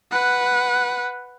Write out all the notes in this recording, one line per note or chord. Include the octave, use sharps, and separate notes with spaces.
B4 F#5